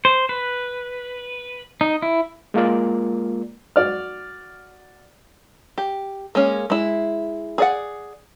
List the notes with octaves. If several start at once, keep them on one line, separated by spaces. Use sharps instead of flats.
C5
B4
D#4
E4
G#3 A#3 F4 A#4 D5
F#4 D5 F6
G4
G#3 A#3 C#4
G#3 E4
G#4 D5 F#5